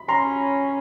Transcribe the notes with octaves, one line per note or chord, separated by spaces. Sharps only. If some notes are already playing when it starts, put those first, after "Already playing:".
Already playing: B5
C#4 A#5 C6